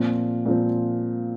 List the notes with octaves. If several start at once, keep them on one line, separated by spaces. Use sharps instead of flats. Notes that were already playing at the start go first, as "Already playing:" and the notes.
Already playing: A#2 F3 C4
A#2 F3 C4